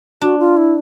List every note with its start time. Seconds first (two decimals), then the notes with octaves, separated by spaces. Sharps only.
0.21 D4 F#4
0.39 F4
0.57 E4